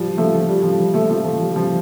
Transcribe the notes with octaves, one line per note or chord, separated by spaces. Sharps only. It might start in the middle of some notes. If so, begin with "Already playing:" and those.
Already playing: F3 G3
F3 A3
G3
F3
G3
F3 A3
F3 A3
F3
G3
G3
F3